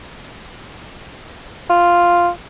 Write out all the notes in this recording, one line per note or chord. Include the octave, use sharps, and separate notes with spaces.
F4